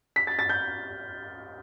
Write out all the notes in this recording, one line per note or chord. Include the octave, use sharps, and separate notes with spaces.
B6
A6
A6
G6